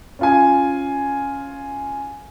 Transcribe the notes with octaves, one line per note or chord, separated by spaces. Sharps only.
C#4 F4 G#5